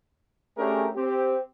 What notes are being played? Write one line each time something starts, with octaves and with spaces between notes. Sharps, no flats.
A3 C#4 D4 G4 G#4 A#4
C4 G4